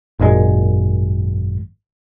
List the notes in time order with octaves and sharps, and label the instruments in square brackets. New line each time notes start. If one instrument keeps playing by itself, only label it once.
[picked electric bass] G#1 F#2 A#2 G#3